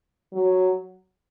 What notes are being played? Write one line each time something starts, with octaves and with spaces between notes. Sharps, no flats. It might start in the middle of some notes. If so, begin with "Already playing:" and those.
F#3